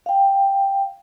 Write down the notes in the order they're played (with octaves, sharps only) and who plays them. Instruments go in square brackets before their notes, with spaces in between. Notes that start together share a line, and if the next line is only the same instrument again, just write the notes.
[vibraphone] F5 G5